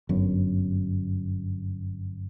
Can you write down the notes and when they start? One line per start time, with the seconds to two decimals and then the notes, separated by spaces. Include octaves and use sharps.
0.09 G1 F#2